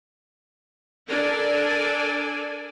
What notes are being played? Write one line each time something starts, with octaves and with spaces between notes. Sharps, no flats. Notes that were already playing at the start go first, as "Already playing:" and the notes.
D4 A4 A#4 D5 G#5